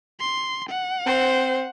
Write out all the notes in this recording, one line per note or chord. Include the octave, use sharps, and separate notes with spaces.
C6
F#5
C4 C5